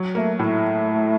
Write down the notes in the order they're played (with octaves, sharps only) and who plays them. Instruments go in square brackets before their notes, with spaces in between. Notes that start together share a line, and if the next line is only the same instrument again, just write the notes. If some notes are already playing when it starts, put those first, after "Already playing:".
Already playing: [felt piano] F#3
[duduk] A3 [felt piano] A#3
[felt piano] A2 [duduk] A3